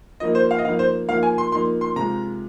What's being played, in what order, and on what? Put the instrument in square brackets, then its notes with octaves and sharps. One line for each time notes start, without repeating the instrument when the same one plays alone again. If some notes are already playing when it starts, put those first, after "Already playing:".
[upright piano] F3 A#3 D#4 [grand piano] D#5
[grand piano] C5
F5
D#5
[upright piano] F3 A#3 D#4 [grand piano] F5
[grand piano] C5
[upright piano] F3 A#3 D#4 [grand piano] F5
[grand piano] G#5
C6
[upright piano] F3 A#3 D#4 [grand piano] C6
[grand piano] C6
[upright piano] C3 G#3 F4 [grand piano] A#5